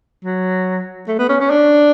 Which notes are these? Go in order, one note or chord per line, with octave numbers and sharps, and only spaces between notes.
F#3
A3
B3
C#4
C#4
D4